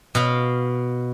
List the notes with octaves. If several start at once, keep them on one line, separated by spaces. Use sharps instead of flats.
B2 F5